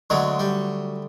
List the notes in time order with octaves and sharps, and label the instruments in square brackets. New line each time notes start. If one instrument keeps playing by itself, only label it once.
[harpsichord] D2 D3 F#3 G#3
G3